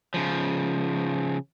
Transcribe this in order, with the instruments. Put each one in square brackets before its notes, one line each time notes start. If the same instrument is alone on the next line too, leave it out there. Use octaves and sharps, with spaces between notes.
[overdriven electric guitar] C#3 F3